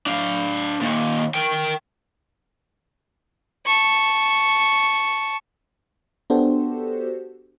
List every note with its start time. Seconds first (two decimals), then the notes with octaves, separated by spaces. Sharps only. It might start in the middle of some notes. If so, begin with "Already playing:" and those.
0.06 D4 F5
0.81 D#2 A#2
1.34 A#4 G5
3.66 A5 C#6
6.30 B3 D4 F#4 G4 A4 C5